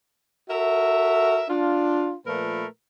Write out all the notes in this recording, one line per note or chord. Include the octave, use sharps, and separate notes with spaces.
F#4 A4 A#4 E5
D4 F4
A#2 F3 A3 A#4 B4